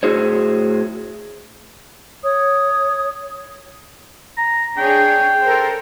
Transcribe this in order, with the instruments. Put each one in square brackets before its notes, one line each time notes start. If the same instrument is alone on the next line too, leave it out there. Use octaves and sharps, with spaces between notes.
[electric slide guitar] A2 E4 F#4 G#4 C5 C#5
[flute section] C#5 D#6
[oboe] A#5
[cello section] D4 G#4 C#5 [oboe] G5
[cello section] A4 A#4 C5